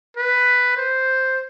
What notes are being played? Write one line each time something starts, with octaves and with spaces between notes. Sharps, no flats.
B4
C5